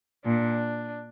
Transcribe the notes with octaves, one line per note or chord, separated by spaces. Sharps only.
A#2 D4